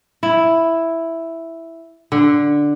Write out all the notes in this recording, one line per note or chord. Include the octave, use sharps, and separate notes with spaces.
E4
D3